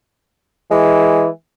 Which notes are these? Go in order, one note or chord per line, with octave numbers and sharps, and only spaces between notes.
E3 G#3